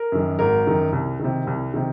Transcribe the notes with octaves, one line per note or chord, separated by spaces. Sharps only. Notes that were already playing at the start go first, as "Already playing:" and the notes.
Already playing: A#4
F#2 D#3
G#1 A#4
F#2 D#3
C2
C3 D#3
C2
C3 D#3